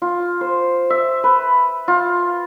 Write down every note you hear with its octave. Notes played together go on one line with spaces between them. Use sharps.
F4
C5
E5
B4
F4